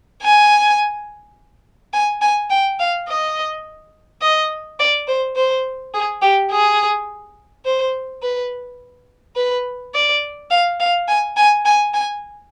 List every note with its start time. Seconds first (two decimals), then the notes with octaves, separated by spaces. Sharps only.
0.22 G#5
1.93 G#5
2.22 G#5
2.50 G5
2.80 F5
3.08 D#5
4.22 D#5
4.79 D5
5.08 C5
5.36 C5
5.94 G#4
6.22 G4
6.51 G#4
7.65 C5
8.23 B4
9.36 B4
9.94 D5
10.51 F5
10.80 F5
11.08 G#5
11.37 G#5
11.65 G#5
11.94 G#5